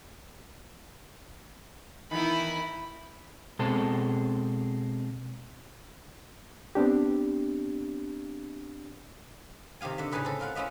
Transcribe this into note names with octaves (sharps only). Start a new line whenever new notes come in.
D#3 E3 B3 E4 B5
B2 G#3 C4 A4
B3 C4 D4 G4
C3 D#3 G4 F5 G#5
D3 E5
A2 C#3 D#4 G#4 B4 D#5
C4 A4
F4 A#4 F5 F#5
C#4 E4 F4 D#5 E5